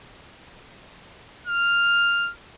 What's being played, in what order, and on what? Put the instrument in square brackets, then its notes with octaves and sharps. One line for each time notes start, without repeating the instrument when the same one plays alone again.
[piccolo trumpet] F6